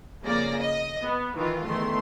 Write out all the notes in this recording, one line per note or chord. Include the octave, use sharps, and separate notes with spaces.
F2 C#3 A#3 D5 A#6
D#5
B3
D#3 E3 F4
E2 D#3 A3 C6